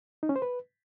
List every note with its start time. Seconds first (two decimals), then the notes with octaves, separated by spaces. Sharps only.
0.23 D#4
0.29 C#4
0.36 C5
0.42 B4